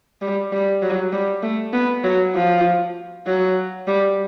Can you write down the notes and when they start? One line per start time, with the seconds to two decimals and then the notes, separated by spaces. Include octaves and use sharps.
0.22 G3
0.52 G3
0.82 F#3
1.12 G3
1.43 A3
1.73 B3
2.04 F#3
2.35 F3
3.27 F#3
3.87 G3